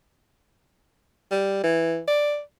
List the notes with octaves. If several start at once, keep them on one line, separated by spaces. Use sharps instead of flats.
G3
E3
D5